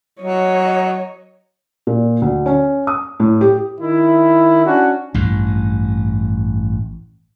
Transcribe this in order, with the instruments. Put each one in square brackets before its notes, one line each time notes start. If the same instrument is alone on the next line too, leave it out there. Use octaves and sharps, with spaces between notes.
[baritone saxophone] F#3 [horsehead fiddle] C#5 D#5
[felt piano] A#2
D2
C#4
D#6
A2
G4
[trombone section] D#3 E4
C#4 D4 F#4
[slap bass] A1 G2